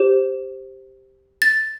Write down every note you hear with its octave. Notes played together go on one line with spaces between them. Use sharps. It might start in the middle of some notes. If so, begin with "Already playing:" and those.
Already playing: G4 C5
A6